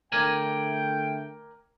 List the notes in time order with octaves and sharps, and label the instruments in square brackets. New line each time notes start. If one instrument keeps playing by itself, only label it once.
[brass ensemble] D3 A3 G5 [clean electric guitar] A#4 D5 G#5